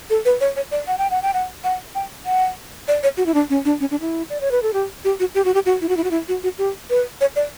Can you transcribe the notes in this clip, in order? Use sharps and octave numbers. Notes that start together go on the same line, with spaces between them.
A4
B4
C#5
C#5
D5
F#5
G5
F#5
G5
F#5
F#5
G5
F#5
D5
C#5
F#4
E4
D4
C#4
D4
C#4
D4
E4
D5
C#5
B4
A4
G4
G4
F#4
G4
F#4
G4
F#4
E4
F#4
E4
F#4
E4
F#4
F#4
G4
B4
C#5
D5